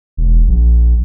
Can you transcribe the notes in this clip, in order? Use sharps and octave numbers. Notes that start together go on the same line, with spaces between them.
E1
A#1